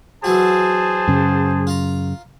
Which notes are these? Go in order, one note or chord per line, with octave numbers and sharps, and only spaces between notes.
E3 F#3 F#4 G#4 C5 A5
F#2 C#3
F4 A#5